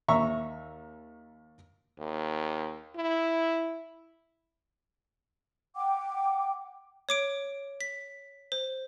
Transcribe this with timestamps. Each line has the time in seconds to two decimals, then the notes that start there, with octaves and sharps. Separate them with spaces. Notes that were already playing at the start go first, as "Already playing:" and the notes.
0.08 D#2 E5 A#5 C#6
1.99 D#2
2.96 E4
5.75 F#5 G5 D6
7.09 C#5 D6 D7
7.81 B6
8.52 C5